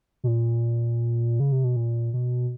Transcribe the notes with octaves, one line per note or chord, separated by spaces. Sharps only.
B2
A#2
C#3
C3
B2
A#2
B2